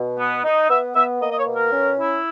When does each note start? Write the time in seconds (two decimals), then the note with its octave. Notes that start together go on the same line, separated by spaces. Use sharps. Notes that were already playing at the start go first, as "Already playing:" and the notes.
Already playing: B2
0.18 B3
0.44 D#4
0.70 B3 E5
0.95 B3 E5
1.21 A#3 D#5
1.31 D#5
1.39 C#5
1.46 B2
1.55 A#4
1.72 C#4
1.99 E4